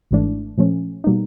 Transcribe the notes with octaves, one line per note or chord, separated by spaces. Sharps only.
G#1 G#2 E3 A3 D4
A#2 F3 A3 C#4
B2 G3 A#3 D#4